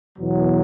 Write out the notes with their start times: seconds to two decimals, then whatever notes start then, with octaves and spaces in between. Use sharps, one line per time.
0.18 E2 B2 F#3